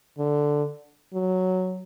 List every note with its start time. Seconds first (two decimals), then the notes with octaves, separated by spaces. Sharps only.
0.18 D3
1.13 F#3